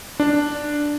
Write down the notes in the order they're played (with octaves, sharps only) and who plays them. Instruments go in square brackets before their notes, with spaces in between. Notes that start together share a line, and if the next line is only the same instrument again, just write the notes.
[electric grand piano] D4